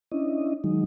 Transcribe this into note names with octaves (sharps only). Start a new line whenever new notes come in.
C#4 D4 E4 D#5
D#3 F#3 G#3 D#4